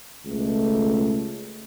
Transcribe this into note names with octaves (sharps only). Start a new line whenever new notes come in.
C#2 B2 A3